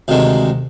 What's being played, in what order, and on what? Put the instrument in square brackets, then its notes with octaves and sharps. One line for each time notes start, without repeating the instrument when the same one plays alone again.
[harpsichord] D2 C3 D#3 G#3